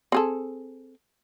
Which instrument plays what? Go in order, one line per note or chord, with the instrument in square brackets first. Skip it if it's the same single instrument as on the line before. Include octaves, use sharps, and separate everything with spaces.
[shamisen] C4 G#4 A4